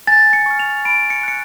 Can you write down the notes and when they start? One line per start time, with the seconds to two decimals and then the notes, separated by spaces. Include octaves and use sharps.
0.07 G#5 A6
0.33 C#7
0.46 C#6 F6
0.59 F7
0.85 B5 D7
1.10 C#7
1.23 F#6 C#7